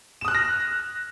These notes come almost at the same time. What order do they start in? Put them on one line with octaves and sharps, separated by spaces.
E7 D#6 F#6 F6 A#6